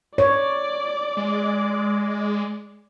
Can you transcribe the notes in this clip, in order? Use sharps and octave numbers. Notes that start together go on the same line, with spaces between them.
C#5 D5
G#3